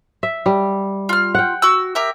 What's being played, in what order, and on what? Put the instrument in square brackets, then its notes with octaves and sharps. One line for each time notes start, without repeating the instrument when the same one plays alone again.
[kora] E5
G3
[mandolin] F4 F6
[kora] F#5 G5
[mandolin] F#4 E6
G4 A#4 E5